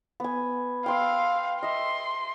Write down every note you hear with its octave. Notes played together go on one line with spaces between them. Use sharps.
B3 G#5
F5 G5 C6 E6
D#5 E5 C6